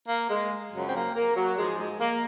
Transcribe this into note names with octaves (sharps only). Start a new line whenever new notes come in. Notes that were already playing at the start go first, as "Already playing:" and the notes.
A#3
G#3
F#2 C#3 F3 F#3
C4
A#3
A#3
F#3
G#2 F3 G#3
G#3
A#3